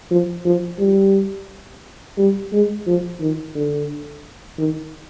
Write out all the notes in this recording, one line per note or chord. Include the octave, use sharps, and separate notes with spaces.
F3
F3
G3
G3
G#3
F3
D#3
D3
D#3